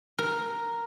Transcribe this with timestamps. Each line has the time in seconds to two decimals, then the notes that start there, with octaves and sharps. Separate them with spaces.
0.18 A#4